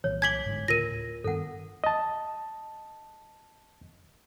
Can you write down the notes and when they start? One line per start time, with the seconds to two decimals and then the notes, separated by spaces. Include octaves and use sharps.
0.04 C2 A#2 E3 C#5
0.22 G#5 D6 G#6 B6 F#7
0.46 G1 G#2 D3
0.68 D2 A2 C#3 F4 A#4 A#6 D#7
1.24 G2 D#3 B3 A4 F#5
1.84 D#5 A5